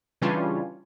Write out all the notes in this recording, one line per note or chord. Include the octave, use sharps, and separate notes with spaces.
C#3 E3 G3 C#4 D4 F4